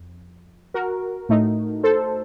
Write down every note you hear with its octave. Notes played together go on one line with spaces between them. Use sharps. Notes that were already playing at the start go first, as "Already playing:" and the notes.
Already playing: F2
F#4 A#4
A2 A3 D#4
A4 C5